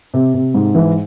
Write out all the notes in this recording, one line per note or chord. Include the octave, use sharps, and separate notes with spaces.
C3
C3
G#2
E3